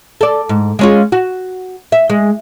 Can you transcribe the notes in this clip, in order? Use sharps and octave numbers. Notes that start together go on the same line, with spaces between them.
A4 D5
G#2
G#3 C#4 F4
F#4
E5
G#3